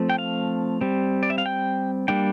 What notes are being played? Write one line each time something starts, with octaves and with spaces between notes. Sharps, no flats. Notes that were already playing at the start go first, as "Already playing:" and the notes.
Already playing: F3 A3 C4
G5
F5
G3 C4
D5
E5
F5
G5
G3 A#3 D4 G5